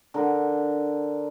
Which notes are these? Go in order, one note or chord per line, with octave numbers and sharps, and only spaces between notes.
D3 A#4